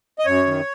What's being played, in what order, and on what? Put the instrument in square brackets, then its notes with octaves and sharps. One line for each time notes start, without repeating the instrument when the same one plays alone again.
[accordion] D#5
F#2 C#5
D#3